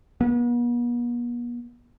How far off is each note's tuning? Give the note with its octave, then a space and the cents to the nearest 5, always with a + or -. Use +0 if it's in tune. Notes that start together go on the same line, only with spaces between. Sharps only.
B3 -45